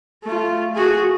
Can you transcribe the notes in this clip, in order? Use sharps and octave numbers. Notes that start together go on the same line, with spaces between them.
A3 F4
F#4 G#4